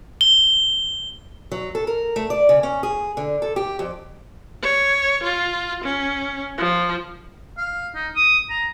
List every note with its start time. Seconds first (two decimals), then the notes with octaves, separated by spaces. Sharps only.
0.21 G7
1.52 F#3
1.75 A4
1.87 A#4
2.16 A3
2.30 D5
2.49 C#3
2.63 C#4
2.83 G#4
3.17 D3
3.42 A4
3.56 G4
3.79 F2
4.62 C#5
5.24 F4
5.84 C#4
6.58 F3
7.58 F5
7.95 D#4
8.16 D#6
8.50 A#5